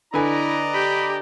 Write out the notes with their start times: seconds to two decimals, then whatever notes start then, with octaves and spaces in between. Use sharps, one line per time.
0.14 D3 E4 B4 D5 D#5 G#5 A#5
0.74 G4 B5